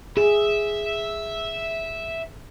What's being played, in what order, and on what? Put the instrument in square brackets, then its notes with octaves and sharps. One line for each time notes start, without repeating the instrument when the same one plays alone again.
[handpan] G#4 [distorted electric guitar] E5